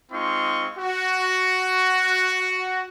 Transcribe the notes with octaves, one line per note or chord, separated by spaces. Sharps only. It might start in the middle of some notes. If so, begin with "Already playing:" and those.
G#3 C4 D#4 F4 C6 C#6
F#4